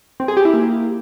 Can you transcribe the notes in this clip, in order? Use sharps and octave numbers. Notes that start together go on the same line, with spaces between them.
C4
G#4
G4
E4
A#3